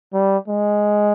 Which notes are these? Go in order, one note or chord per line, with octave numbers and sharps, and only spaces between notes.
G3
G#3